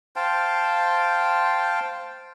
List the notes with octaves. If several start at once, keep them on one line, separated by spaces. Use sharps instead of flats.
C5 F5 G5 A5